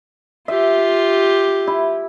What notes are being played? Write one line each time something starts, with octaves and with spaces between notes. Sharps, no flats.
F4 G4 E5
E4